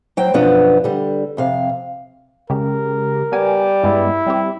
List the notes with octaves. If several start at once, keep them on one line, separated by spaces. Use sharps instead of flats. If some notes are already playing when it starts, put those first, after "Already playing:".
F#3 C5 G5
F#2 B2 F3 B3 D4
D3 G3
F2 C3 F5
C#3 G#3 G4 A#4
G3 B3 G#5
G2 G#3 B3 E4
G3 C4 G4